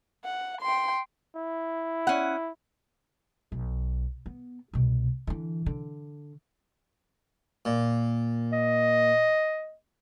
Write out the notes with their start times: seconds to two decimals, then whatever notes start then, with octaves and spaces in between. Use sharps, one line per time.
0.24 F#5
0.61 G5 C6
1.36 E4
2.07 C#4 F#5
3.52 B1
4.26 B3
4.73 C2 B2
5.27 D3 E3
5.66 D3
7.65 A#2
8.52 D#5